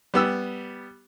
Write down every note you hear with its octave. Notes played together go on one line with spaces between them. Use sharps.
G3 B3 E6